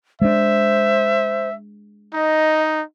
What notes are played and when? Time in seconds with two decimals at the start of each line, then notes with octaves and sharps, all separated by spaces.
0.22 G#3 D4 C5 E5
2.14 D#4 D#5